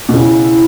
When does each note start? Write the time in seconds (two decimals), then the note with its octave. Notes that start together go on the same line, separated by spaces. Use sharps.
0.09 B2
0.14 C#3 E4
0.45 E4